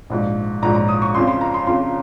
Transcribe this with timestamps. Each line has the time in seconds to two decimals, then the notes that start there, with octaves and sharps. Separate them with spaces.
0.10 A#1 G#2 F3
0.62 A#1 G#2 F3 A#5
0.75 A#5
0.89 D#6
1.02 C#6
1.14 F2 C#3 F3 C6
1.27 C6
1.41 A#5
1.54 C6
1.67 F2 C#3 F3 C6